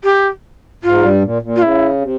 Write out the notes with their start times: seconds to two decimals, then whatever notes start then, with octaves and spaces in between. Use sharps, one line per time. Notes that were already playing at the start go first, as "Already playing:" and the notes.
0.04 G4
0.83 G#2 F4
1.02 G2 G3
1.22 A#2
1.42 A#2
1.56 F4
1.62 C#3 E4
2.01 C3